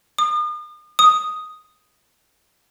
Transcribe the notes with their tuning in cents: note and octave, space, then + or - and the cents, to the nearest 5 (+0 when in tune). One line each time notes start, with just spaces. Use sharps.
D#6 -40
D#6 +0